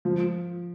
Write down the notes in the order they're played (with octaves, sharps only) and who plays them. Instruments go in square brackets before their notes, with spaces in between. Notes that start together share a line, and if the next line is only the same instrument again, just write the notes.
[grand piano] F3